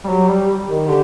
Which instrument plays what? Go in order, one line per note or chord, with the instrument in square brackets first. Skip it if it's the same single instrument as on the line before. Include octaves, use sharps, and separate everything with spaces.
[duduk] G3
[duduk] F#3 [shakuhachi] G4
[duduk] G3
D#3
[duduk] D3 [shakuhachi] G4